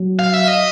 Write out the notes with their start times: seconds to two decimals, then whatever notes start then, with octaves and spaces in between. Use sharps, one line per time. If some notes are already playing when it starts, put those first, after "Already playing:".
Already playing: F#3
0.19 F5
0.33 E5
0.48 D#5